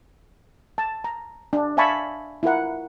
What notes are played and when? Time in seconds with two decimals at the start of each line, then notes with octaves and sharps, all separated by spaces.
0.78 A5
1.04 A#5
1.53 D4
1.77 E5 F5 G#5 A5 B5 C#6
2.43 E4 F4 A#4 F#5